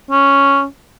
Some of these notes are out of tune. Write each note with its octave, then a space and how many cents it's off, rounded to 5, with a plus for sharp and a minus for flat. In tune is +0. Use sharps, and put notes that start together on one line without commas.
C#4 +0